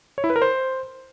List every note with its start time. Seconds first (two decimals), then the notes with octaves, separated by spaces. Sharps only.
0.18 C#5
0.24 E4
0.30 B4
0.36 A#4
0.42 C5